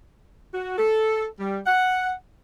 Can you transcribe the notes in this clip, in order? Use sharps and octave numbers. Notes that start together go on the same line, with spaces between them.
F#4
A4
G3
F#5